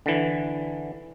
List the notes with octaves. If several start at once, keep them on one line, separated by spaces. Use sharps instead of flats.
D3 E3